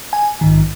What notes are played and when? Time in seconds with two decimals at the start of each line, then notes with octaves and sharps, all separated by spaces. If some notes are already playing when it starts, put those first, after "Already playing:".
0.13 G#5
0.41 A#1 G#2 D#3